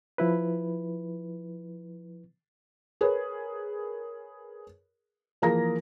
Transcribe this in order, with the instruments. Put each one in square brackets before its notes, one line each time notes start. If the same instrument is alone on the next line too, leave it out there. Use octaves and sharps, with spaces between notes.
[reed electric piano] F3 E4 B4
[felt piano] G#4 A#4 B4 C#5
E3 F3 A#3 G#4 A#5 A#6